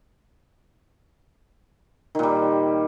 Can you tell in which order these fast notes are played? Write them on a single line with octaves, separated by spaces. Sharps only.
D#3 A#2 G3